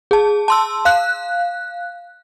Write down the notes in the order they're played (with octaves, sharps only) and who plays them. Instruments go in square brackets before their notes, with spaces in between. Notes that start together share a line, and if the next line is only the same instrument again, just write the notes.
[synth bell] G#4 A5
A5 C6 E6
F5 F#6